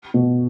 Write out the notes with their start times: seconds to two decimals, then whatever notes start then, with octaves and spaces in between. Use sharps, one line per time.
0.14 B2